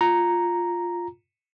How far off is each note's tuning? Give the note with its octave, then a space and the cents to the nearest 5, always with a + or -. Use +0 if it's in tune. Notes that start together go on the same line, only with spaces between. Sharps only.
F4 +0 A#5 +0